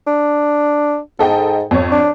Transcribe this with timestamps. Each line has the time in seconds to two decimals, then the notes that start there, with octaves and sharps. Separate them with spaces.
0.07 D4
1.19 G#2 A4 D#5 G5
1.71 F2 C#5
1.92 D4